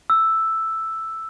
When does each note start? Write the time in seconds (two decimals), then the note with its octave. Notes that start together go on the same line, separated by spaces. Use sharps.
0.10 E6